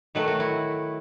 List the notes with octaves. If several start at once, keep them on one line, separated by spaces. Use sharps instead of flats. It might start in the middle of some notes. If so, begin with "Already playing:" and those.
D#3 F#3 A3 B4
F#4
E4